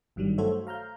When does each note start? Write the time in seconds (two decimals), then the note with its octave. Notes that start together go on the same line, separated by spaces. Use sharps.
0.16 G#1 G2 D#3 F#3 G3
0.38 A3 F#4 A4 C5 C#5 E5
0.67 F5 A#5 F6 G6